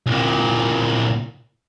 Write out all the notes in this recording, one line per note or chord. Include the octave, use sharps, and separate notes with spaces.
C2 A#2